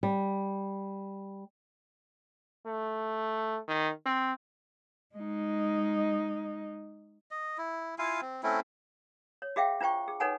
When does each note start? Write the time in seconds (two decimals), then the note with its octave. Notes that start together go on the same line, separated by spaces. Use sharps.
0.03 G3
2.66 A3
3.68 D#3
4.06 C4
5.15 G#3 D#4
7.31 D#5
7.58 E4
7.99 E4 F4 F5 G#5
8.21 C4
8.43 A3 C4 C#4 E4
9.42 C#5
9.56 F#4 G#4 E5 F5 G5
9.80 D4 F4 C5 G5 C#6
10.08 G#4
10.20 D#4 A4 B4 C#5 F#5 G#5